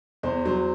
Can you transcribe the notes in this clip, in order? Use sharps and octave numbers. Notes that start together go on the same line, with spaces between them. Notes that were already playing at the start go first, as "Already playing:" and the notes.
E2 C5
F#3 C5